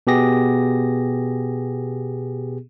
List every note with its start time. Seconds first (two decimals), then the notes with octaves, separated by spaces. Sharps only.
0.07 B2 B3 G4 G#4 A#6